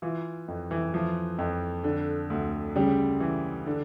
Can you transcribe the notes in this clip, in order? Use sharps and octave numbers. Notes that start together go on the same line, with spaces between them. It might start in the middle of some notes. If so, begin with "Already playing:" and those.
E3 F4
F2
E3
E3 F3
F2
D3
D2
C#3 G3
E3
D3